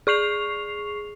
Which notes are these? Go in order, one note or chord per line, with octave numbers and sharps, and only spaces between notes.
G#4 C#6 C7 F7